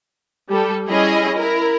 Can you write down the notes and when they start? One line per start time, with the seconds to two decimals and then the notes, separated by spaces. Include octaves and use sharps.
0.50 G3 A4
0.86 G3 C#4 E4 G#4 D#5
1.36 E4 A#4